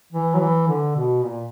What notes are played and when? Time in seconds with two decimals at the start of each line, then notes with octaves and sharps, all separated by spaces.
0.13 E3
0.35 F#3
0.40 E3
0.68 D3
0.96 B2
1.24 A#2